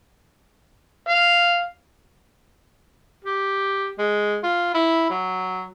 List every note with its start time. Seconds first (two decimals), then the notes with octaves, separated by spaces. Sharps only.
1.09 F5
3.25 G4
3.98 G#3
4.43 F4
4.74 E4
5.10 F#3